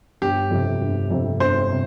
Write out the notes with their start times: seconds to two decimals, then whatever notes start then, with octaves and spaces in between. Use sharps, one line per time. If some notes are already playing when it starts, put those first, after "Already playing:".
0.22 G1 G4
0.51 F2 C3
0.81 G1
1.10 F2 C3
1.40 G1 C5
1.71 C3